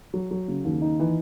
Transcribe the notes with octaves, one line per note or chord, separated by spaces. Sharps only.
F#3
F#3
C#3
D#2
D#4
E3